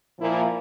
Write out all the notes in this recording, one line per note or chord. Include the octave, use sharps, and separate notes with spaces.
A#2 F3 A#3 E4